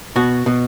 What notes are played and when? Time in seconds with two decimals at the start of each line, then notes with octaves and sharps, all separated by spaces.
0.16 B2 F#4
0.46 B2